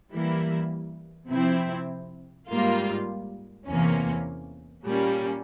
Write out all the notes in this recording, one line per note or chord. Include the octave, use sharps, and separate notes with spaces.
E3 G3 A#3 E4
C3 F3 C4 E4
G#2 G3 A#3 F4
E2 C3 E3 A#3 C#4
A#2 G3 A#3 C#4